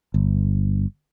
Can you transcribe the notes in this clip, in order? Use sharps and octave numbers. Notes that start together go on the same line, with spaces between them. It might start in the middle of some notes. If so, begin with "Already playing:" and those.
G1